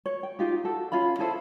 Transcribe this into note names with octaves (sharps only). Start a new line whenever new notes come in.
C#5
G5
D#4 F4 G4
F#4 A4
C#4 F4 F5 B5
E4 G#4 A4 C5